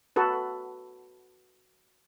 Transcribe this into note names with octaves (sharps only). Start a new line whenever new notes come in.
F#4 A4 B4